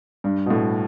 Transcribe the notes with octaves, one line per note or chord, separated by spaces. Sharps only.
G2
B2
A2